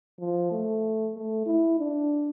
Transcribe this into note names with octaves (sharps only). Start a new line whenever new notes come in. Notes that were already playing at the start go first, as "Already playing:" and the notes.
F3
A3
A3
E4
D4